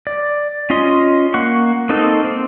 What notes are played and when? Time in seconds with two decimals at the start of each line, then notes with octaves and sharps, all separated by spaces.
0.07 D5
0.70 C#4 F4 D#5 C6
1.34 A#3 F#5 C#6
1.89 A#3 C4 D#4 A4
2.24 C4